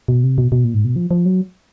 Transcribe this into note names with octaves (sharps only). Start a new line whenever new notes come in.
B2
C3
B2
B2
A#2
G#2
B2
F3
F3
F#3